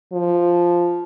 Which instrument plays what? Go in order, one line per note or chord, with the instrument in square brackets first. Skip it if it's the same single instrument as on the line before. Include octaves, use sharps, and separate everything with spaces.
[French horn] F3